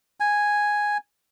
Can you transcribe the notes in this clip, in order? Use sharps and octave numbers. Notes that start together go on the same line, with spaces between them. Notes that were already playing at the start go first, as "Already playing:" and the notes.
G#5